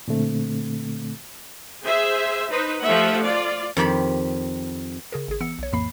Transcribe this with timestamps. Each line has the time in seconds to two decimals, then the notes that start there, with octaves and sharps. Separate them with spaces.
0.08 A#2 D3 A3 C4
1.83 G#4 C5 E5
2.50 D#4 B4 C5
2.82 F3 A3 G4 E5 F#5
3.25 F4 D5
3.77 F2 D#3 G4 B5
5.12 C#3 G#4 A#4
5.28 G#1 G#4
5.41 E3 B3 E6 C#7
5.59 B1 C#5
5.73 F2 A2 E3 A#3 B5 C7